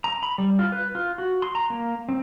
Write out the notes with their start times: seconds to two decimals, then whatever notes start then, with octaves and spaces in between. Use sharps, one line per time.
0.04 A#5
0.23 B5
0.38 G3
0.59 F4
0.72 B4
0.95 F4
1.18 F#4
1.42 C6
1.55 A#5
1.70 A#3
2.09 C4